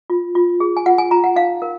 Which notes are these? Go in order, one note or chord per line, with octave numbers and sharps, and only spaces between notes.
F4
F4
G#4
G#5
F4 F#5
G#5
F4 A#5
F#5
D#4 F5
A#4